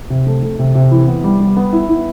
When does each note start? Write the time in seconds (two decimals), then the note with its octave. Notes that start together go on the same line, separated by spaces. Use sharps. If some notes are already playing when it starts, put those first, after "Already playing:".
0.10 C3
0.27 A3
0.43 A3
0.59 C3
0.75 C3
0.91 E3
1.07 B3
1.24 G3
1.40 G3
1.57 B3
1.73 E4
1.89 E4